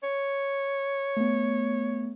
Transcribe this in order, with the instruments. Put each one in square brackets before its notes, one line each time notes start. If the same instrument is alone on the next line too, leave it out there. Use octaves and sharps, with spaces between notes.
[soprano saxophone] C#5
[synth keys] A3 B3